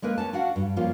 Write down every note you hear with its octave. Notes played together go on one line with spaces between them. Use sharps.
G#3 A#3 A#4 B4
C#4 A5
D4 F#4 F5 F#5
G2
F3 G3 A#3 C#4 F4